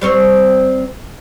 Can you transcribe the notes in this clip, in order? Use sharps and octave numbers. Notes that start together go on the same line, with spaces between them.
G3 C4 C#5